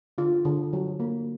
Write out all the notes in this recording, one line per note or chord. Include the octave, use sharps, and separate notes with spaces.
D3 F4
D3
F#3
A#3